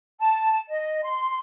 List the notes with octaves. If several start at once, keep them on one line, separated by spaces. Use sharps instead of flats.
A5
D#5
C6